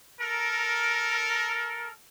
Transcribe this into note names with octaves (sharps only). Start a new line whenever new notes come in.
A4 A#4